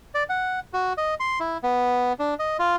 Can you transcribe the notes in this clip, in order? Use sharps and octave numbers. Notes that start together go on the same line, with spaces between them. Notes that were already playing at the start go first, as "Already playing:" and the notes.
D5
F#5
F#4
D#5
C6
E4
B3
D4
D#5
F4